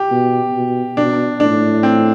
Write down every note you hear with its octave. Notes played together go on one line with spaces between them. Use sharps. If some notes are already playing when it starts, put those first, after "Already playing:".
Already playing: G4
B2
B2
B2 D4
A2 D4
C4